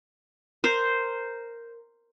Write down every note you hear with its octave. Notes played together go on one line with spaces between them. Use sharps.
A#4 C5